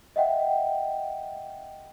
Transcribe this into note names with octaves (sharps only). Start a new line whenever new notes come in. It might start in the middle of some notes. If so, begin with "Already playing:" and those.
D#5 E5 F#5 G5